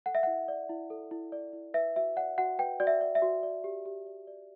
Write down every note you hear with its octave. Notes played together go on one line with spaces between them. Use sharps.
A4 F#5
E5
E4 F#5
D5
E4
A4
E4
D5
E4
B4 E5
F#4 E5
D5 F#5
F#4 F#5
B4 G5
F#4 D5
E5
D5
E5
F#4
D5
G4
G4
D5
D5